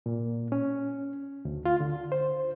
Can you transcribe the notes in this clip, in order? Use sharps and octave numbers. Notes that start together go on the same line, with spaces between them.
A#2
C#4
D2
F4
D3
C5